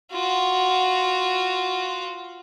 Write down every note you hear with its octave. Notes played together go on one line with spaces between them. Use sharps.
F4 F#4